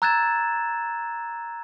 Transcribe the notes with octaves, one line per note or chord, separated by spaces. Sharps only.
A#5 E6 F#6 G#6 A6 E7